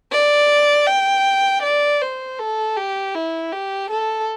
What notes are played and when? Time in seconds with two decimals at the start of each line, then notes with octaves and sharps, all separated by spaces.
0.12 D5
0.87 G5
1.63 D5
2.01 C5
2.39 A4
2.77 G4
3.15 E4
3.53 G4
3.91 A4